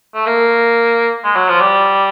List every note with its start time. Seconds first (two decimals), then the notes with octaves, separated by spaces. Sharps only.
0.15 A3
0.26 A#3
1.24 G#3
1.36 F#3
1.48 F3
1.61 G3